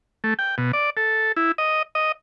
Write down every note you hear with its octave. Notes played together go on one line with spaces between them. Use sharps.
A3
G5
B2
D5
A4
E4
D#5
D#5